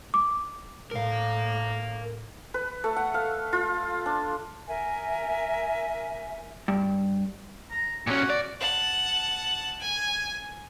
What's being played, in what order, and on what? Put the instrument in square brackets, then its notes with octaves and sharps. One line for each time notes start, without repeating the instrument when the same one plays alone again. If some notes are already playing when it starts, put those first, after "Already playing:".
[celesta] D6
[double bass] A2 [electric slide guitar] A#4 F5
[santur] B4
A3
F#5
F5
F4
D4
[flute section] A#4 E5 G#5
[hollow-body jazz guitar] G2
[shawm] A#5
[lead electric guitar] A#2 C#4 [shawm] F#4
[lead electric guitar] D5
[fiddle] F#5 A5
G#5